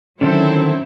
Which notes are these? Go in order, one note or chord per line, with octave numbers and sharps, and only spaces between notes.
D3 D#3 F#3 C4 C#4 E4 A4